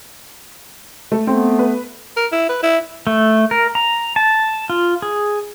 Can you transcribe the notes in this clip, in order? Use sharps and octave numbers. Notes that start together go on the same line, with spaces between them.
A3
A3 B3 C4
B4
A#4
E4
B4
E4
A3
A#4
A#5
A5
F4
G#4